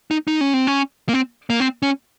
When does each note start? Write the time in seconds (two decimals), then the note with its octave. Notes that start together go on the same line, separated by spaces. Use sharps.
0.11 D#4
0.28 D#4
0.41 C#4
0.54 C4
0.67 C#4
1.09 A#3
1.14 C4
1.50 A#3
1.60 C4
1.82 C#4